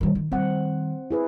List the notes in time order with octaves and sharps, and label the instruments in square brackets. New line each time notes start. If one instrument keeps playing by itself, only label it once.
[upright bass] D#3 G3
D#3
[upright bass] D#3 G3 [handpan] C4 F#5
[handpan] E4 G#4 B4